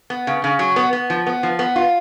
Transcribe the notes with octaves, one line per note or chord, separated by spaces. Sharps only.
B3
C#3
C#3
F#3
B3
B3
F3
B3
F3
B3
F4